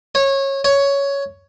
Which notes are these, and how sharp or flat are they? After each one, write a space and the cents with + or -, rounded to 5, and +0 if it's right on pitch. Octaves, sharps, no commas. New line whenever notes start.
C#5 -20
C#5 +10